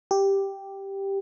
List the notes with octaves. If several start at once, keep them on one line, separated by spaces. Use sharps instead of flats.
G4